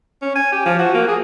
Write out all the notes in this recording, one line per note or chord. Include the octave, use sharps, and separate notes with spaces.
C#4
G#5
G4
F3
F#4
A#3
G#4